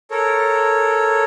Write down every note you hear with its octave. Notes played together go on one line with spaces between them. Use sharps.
A4 A#4 C#5